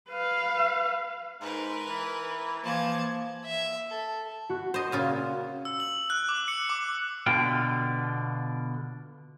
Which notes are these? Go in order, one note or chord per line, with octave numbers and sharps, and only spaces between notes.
B4 F5
G#2 A#4 B4
E3
E3 F3 A#3 A5 G#6
E5
A4
F#4
C5 D#5
A#2 C#3 F4
E6
F#7
F#6
D6
C#7
D6
B2 D3 F4 G5